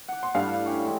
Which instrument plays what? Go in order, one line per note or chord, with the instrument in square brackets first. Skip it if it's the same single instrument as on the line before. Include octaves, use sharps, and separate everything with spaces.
[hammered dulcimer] F#5 D6
[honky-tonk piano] C6
[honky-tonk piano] G2 G3 F5 [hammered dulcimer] A3 E4
[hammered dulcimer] B4 A5
C#4 G4 C#5
E3 G#3 G4